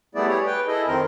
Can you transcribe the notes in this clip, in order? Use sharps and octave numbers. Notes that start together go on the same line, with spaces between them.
G3 A3 B3 E4 G#4 D5
G4 G#4 C#5
B4 G5
E4 G#4 A4 D#5
F2 D#3 C4 A#4